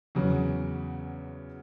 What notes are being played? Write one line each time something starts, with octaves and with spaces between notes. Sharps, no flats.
E2 C#3 F#3